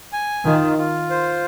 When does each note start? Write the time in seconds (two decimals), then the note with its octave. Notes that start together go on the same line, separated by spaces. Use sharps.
0.13 G#5
0.45 D#3 F4
0.78 F4
1.10 C5